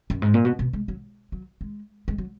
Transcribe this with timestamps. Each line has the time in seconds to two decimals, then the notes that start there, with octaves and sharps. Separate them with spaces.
0.10 F#2
0.22 G#2
0.34 A#2
0.45 B2
0.59 B2
0.73 G#3
0.88 F#3
1.32 F#3
1.61 G#3
2.08 G#3
2.18 F#3